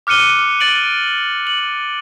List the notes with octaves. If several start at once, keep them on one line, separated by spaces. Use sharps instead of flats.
D6 F6 F#6 C#7 D#7 G7
A6 D7 F#7
F#7